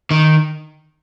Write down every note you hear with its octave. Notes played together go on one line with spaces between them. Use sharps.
D#3